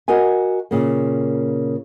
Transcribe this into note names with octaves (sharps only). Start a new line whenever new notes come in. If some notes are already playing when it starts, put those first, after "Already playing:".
F#4 A#4 D#5 F5 G#5
A#2 C#3 A#3